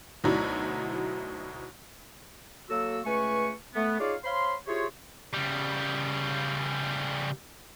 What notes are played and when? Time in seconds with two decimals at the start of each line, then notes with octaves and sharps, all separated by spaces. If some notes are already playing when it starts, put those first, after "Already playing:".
0.24 D2 B2 F#3 D#4 E4 D5
2.70 F#3 A#3 F#4 A4 E6
3.05 C#2 A3 B4 G#5 C#6
3.74 A3 B3
3.99 D#4 F4 G#4 C#5 D5 F5
4.24 C5 C#5 F5 B5 C6
4.67 E4 F4 G4 G#4 C5 C#5
5.33 C#3 G3